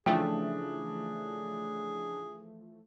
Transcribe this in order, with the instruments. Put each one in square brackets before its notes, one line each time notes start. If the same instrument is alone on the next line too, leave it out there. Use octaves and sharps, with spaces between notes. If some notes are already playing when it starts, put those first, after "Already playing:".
[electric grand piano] C#3 D4 [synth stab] E3 F3 A3 [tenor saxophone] G#4 [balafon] G5